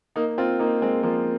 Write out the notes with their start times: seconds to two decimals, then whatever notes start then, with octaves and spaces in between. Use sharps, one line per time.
0.16 A#3 D#4
0.38 C4 F4
0.59 A#3 D#4
0.82 G#3 C4
1.03 F3 A#3